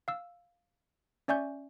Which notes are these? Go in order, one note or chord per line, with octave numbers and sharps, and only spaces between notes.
F5 E6
C#4 D5 E5 G#5 C#6 G6